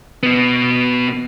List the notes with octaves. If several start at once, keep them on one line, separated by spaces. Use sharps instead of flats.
B2 B3